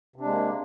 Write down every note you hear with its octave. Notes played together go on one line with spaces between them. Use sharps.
C3 G#3 A#3 D4